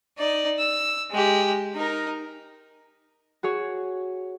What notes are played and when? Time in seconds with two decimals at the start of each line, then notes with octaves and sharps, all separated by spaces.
0.18 D#4 D5
0.59 E6
1.11 G#3 G4
1.75 D#4 A#4
3.43 F#4 G#4 C#5